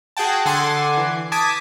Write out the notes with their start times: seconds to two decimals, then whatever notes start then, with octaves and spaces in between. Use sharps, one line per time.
0.17 F#4 G#4 F#5 G5 A5
0.45 D3 A4 F#5 G#5 C6 D6
0.97 E3
1.32 G#5 A5 D6 D#6 G#6 B6